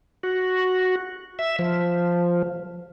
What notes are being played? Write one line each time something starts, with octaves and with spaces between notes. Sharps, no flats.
F#4
E5
F3